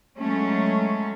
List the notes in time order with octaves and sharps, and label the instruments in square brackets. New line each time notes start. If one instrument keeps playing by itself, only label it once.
[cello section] F#3 G#3 A3 C#4